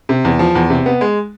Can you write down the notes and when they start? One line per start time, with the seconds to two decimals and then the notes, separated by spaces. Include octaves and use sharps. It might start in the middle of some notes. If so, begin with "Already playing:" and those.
0.09 C3
0.25 E2
0.39 F3
0.55 E2
0.70 C3
0.86 B3
1.01 G#3